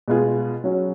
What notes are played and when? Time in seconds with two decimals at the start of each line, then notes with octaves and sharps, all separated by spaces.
0.08 B2 G#3 B3 F4 G#4
0.64 F#3 C#4 F#4